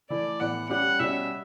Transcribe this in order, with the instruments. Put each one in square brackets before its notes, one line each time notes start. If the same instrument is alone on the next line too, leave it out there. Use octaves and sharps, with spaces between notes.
[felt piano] E3 A3 E4 [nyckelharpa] D5
[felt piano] A2 E3 B3 [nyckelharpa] F#5
[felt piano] G3 C#4 G4 [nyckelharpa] F#5
[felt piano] B2 G3 C#4 [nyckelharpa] E5